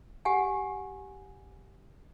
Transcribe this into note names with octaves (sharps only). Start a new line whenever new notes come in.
G4 F#5 G#5